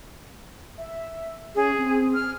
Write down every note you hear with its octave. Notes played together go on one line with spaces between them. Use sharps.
E5
C#4 G#4
C4
F6